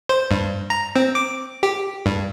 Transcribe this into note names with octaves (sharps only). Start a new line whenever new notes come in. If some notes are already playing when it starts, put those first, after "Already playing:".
C5
G2
A#5
C4
D6
G4
G2